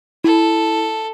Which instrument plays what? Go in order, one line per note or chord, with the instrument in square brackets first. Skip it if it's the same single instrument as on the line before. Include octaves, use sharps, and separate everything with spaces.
[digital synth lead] E4 [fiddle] A4